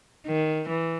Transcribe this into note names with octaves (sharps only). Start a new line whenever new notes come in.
D#3
E3